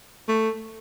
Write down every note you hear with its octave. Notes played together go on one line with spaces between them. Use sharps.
A3